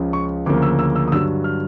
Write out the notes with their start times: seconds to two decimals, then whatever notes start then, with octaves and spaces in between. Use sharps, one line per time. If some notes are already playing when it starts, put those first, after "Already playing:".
Already playing: C#2 C#3 F3
0.13 C#6
0.46 D2 C#3 F3 A#3 D6
0.62 E6
0.79 E6
0.96 E6
1.08 D#6
1.12 G2 D3 F#3 E6
1.44 F6